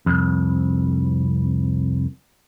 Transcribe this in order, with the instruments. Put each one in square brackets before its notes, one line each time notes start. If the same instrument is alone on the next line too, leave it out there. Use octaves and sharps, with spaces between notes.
[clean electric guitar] C2 F2